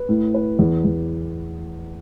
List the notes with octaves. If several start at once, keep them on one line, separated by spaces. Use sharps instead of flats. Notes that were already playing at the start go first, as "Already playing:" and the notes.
Already playing: B4
A2
B4
E2
E2